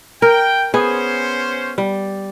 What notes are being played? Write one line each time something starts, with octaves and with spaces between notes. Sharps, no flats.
A#4 G5
B3 C#4 G#4 C5
G3